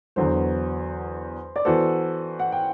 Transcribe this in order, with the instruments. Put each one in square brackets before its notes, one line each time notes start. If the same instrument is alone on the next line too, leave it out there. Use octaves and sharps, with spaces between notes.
[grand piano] E2 D3 F#3 B3 [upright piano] C5
[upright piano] D5
[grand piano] E3 B3 F#4 A4 [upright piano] C5
[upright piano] F#5
G5